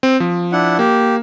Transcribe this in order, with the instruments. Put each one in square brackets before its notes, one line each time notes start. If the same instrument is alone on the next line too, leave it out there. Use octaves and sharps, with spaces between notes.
[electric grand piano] C4
F3
[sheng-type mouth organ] D4 E4 F#5
[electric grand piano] A#3 [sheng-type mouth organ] G4